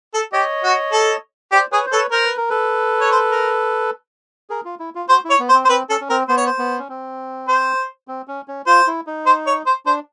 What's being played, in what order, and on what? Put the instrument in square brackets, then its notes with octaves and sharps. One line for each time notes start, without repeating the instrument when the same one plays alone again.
[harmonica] A4
[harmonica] G4 [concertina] C#5 D#5
[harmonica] F#4
A4
[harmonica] G4 [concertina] C5 D5
[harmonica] G#4 [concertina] B4 C#5
[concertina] C5
[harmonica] A4 [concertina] B4 C#5
[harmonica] A#4 [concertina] C5
[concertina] B4
A#4
A4 B4
[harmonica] C#5
C5
A#4
[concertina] G#4 A#4
F4
E4
F4
[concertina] F#4 [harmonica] C5
[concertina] E4
[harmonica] C#5
[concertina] B3
[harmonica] C5
[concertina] C4
[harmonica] C5
[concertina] C4 [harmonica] B4
[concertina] C#4 [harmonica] A4
[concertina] C#4
[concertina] C4 [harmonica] A#4
[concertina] B3 [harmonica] C5
[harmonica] C#5
C5
[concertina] B3
C#4
C4
[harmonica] C5
[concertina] C4
C#4
C#4
[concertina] F4 [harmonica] C5
[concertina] E4
D#4
[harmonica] C5
C#5
C5
[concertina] D4 [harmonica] C5